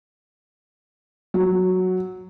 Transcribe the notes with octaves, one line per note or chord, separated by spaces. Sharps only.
F#3